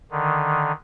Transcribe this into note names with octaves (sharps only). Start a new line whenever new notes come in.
D3 D#3